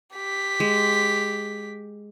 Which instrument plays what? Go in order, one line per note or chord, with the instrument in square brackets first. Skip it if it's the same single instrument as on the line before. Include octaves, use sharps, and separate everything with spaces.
[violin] G4 B6
[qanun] G#3